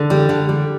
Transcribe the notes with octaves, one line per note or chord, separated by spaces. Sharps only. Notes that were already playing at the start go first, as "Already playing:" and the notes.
Already playing: D3
G3
D3
G3